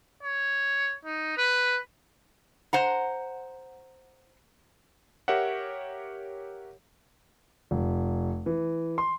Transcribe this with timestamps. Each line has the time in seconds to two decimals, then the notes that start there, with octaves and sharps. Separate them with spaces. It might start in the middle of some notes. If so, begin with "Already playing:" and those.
0.23 C#5
1.05 D#4
1.38 B4
2.73 C5 F#5 A#5
5.28 G4 A#4 C#5 E5 F#5
7.71 F1
8.46 E3
8.98 C6